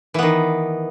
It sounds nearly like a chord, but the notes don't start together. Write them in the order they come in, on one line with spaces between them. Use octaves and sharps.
E3 B3 D#3